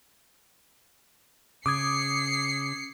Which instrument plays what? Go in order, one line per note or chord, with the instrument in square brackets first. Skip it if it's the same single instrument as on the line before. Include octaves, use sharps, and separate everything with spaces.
[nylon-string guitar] C#3 [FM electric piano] D6 D#6 G#6 [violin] C7 C#7